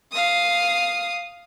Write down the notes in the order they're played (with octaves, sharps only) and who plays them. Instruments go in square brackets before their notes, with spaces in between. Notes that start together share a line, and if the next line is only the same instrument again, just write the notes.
[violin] F5 D#6